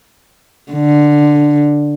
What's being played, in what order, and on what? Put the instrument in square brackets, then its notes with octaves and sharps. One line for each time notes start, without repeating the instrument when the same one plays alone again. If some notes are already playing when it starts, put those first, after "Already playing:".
[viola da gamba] D3